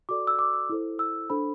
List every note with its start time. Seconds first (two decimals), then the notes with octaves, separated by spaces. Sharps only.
0.09 F#4 A4 D5 D6
0.27 E6
0.39 D6
0.54 E6
0.70 E4 A4 C5
0.99 E6
1.30 D4 A4 C5 B5